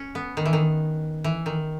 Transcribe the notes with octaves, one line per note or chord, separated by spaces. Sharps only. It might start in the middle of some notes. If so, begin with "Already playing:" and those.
Already playing: C#4
B3
D#3
E3
D#3
E3
D#3